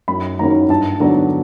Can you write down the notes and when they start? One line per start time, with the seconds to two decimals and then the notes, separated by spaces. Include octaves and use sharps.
0.08 F#2 B5
0.39 D#3 F#3 A#3 C#4 A#5
0.69 G2 A5
1.00 D3 F#3 B3 D4 A#5